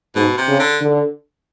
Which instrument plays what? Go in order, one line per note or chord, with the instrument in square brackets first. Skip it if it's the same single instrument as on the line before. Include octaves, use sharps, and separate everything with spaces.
[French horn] G#2 [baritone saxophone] B2
[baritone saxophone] C3
[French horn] C#3
[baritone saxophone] D3
[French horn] D3